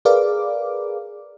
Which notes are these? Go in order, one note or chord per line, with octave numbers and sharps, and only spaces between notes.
G#4 A#4 B4 D5 F5 D6